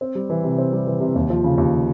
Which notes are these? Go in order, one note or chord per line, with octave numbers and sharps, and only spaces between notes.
C4
G3
E3
C3
C4
G3
E3
C3
D#2
F3
C#3
D#2